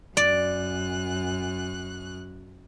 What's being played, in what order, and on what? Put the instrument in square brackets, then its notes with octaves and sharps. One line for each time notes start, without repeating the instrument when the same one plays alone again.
[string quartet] F#2 F#6 [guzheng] D5